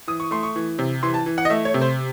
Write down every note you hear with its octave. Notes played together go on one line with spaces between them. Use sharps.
E3 D#6
C#6
A3 C6
C#6
E3
C3
E3 C6
A5
E3
F#5
D#5
A3 E5
C#5
C3
C5